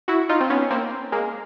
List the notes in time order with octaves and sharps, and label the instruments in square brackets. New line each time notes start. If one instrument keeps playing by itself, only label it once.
[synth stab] E4 F#4
D#4 F4
C4
B3 C#4
A#3 C4
G#3 A#3